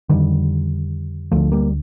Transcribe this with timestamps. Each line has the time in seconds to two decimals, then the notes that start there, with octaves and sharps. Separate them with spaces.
0.09 F2 D3 D#3 G3
1.32 D2 D3 F3 A3
1.52 G3 A#3